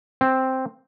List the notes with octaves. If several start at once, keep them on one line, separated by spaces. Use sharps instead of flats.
C4